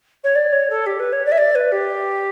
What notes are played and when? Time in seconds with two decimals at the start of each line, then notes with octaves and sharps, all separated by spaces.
0.24 C#5
0.35 D5
0.52 C#5
0.70 A4
0.86 G4
0.99 B4
1.12 C#5
1.25 D5
1.31 E5
1.37 D5
1.55 B4
1.71 G4